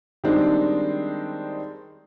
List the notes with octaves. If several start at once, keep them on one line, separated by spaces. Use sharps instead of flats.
D#3 G3 G#3 C4 D4 D#4